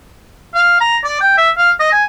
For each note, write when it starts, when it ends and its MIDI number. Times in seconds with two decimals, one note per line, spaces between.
0.54 0.79 77
0.81 0.98 82
1.04 1.20 74
1.21 1.36 79
1.37 1.50 76
1.57 1.72 77
1.80 1.89 75
1.92 2.04 80